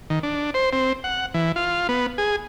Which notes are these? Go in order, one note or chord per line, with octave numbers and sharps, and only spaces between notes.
D#3
D4
C5
C4
F#5
E3
F4
B3
G#4